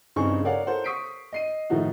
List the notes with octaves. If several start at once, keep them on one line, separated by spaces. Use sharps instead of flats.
G2 C#3 C4 D#4 G#4 C#6
A4 A#4 C#5 D5 F5 F#5
A4 A#4 C5 C#5 F#5
C#6 D#6 B6 C7 D7
D#5 C7 D#7
A2 D#3 F3 A3 D#4 F#4